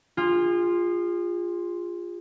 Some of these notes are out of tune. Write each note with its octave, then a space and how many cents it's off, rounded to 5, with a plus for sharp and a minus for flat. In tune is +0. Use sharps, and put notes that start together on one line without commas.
F4 +0 G#4 -35